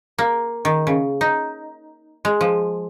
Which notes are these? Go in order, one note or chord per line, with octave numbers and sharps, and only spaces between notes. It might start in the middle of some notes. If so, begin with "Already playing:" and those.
A#3
D#3
C#3
D#4
G#3
F3